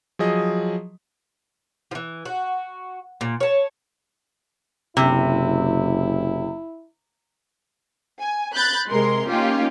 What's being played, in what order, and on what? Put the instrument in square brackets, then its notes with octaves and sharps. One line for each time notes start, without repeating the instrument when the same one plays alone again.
[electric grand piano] F3 F#3 G#4 D#5
[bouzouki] E3 F3
F#4
A#2
C#5 A5
[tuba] F#1 [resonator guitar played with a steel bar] C3 [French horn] E4
[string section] G#5
B5 F#6 G6 A6
C3 G#3 A#4 C6
A#3 C#4 D#4 F4 G4